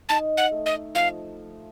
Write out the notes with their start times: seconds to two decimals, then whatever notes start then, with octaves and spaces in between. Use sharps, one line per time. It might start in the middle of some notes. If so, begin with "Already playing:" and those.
0.09 D#4 A5
0.37 F#5
0.51 A3
0.66 D#5
0.95 F3 F5